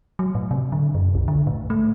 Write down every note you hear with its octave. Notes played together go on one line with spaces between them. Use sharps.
F#3
A2
C3
D3
F#2
B1
D3
A2
A3